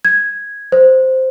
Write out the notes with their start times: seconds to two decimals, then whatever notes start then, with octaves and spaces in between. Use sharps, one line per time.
0.05 G#6
0.72 C5